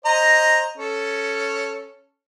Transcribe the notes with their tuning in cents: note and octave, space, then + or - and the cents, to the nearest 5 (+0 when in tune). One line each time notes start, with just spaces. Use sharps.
C5 +10 D#5 +0 A#5 +0
C#4 +0 A4 +0